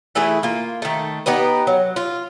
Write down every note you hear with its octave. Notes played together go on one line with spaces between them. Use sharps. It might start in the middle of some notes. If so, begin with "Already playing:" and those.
E3 A3 E4 G#4
A#3 F4
D#3 A3
B3 D#4 G4 B4
F#3
F4